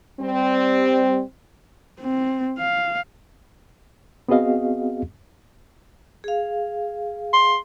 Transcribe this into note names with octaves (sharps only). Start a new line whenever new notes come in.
G3 C4
C4
F5
B3 C4 F#4 G#4 D#5 F5
G#4 F5
C6